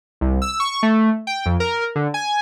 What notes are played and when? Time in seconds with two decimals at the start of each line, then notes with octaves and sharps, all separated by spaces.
0.21 C2
0.42 E6
0.60 C#6
0.83 A3
1.27 G5
1.46 F2
1.60 A#4
1.96 D3
2.14 G#5